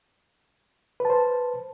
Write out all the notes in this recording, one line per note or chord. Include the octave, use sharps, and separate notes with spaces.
B4 C5 A5